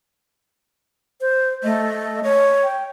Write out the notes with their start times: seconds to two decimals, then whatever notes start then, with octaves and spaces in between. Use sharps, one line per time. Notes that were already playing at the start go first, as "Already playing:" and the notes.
1.21 C5
1.64 A3 D#5
2.24 C#5
2.63 G5